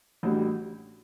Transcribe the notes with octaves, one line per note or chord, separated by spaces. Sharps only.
A1 A2 G3 D4 F#4